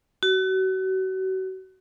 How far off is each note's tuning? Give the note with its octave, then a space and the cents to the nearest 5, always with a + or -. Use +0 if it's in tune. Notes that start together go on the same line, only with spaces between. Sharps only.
F#4 +35